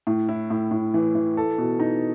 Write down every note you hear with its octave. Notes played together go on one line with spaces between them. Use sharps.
A2
E4
A2
A2
E3
E3
A4
B2
D#4